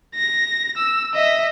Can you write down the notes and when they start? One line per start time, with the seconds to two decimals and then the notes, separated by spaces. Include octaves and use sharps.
0.15 A#6
0.76 E6
1.14 D#5 E5